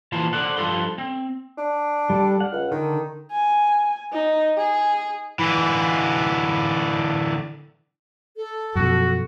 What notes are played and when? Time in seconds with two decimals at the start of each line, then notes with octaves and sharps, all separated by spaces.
0.12 A#2 E3 C5 A5
0.33 A4 C5 D5 F#5
0.57 G2 F3 A4 C6
0.98 C4
1.58 D4
2.10 G3 A4
2.40 F#5 F6
2.52 C#2
2.71 D3 D#3
3.32 G#5
4.13 D#4
4.58 G#4
5.39 D3 E3
8.37 A4
8.75 F#2 B2 F3 F#4